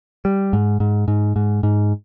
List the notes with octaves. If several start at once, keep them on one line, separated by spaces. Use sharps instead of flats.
G3
G#2
G#2
G#2
G#2
G#2